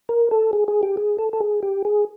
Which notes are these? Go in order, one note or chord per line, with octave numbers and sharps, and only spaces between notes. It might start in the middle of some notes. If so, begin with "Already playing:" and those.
A#4
A4
G#4
G#4
G4
G#4
A4
A4
G#4
G4
G#4